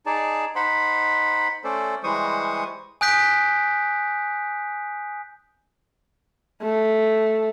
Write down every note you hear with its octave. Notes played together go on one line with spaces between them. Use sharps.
D#4 G#4 D5 A5
D#4 C5 F#5 B5 C6
A3 C#4 A4 C5 D5
E3 G3 G#3 C5 C#6 D#6
G#5 D#6 F#6 G6 B6 D7
A3